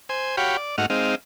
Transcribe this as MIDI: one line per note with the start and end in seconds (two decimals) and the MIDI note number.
0.09 0.36 72
0.09 0.36 80
0.37 0.57 66
0.37 0.57 67
0.37 0.57 73
0.37 0.57 77
0.37 0.57 79
0.37 0.57 83
0.57 0.76 74
0.78 0.86 44
0.78 0.86 57
0.78 0.86 63
0.78 0.86 66
0.78 0.86 78
0.78 0.86 89
0.90 1.15 56
0.90 1.15 60
0.90 1.15 63
0.90 1.15 77